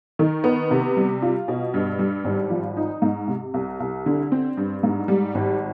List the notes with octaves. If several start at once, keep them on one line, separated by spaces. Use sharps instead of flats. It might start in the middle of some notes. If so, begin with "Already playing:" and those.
D#3
B3
C3
G3
F4
B2
G2
G3
G#1
F3
D#4
G#2
C3
C2
C2
D3
C4
G2
G#2
G3
G#1